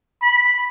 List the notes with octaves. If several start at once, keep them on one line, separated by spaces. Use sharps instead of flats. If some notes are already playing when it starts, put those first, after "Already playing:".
B5